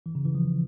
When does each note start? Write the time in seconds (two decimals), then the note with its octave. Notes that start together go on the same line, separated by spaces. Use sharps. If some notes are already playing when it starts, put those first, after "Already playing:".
0.06 E3
0.15 C#3
0.25 E3
0.35 F3